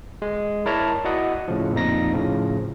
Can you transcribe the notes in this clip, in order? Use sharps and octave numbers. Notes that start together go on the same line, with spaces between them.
G#3
E4 A#4 C#5 D5 A5 A#5
E4 F#4 D5 D#5 F#5 D#6
A2 C#3 F3
F2 A#2 D#4 A#6
A2 C#3 F3